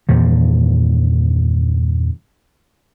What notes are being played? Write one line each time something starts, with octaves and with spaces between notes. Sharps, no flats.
E2 G2 A#2 D#3